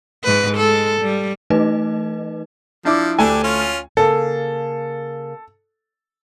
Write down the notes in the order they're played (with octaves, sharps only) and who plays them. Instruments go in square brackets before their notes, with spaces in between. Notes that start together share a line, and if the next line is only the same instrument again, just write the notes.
[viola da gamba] G#2 B4
G#3 A4
G3
[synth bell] E3 A3 D#4 B4 D#5
[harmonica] F3 [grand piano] D4 E4 D6
[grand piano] D2 A4 G#5 [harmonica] D4 G4
[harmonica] C#4 F4
[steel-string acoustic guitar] C#3 A#3 [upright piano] A4